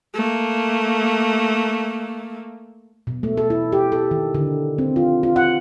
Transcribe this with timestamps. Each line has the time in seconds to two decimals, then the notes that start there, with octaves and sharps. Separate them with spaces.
0.14 A3 A#3
3.07 B2
3.23 A3
3.37 A4
3.50 E4
3.72 G4
3.92 A4
4.11 D#3
4.35 D3
4.78 C4
4.96 F4
5.23 F4
5.36 F#5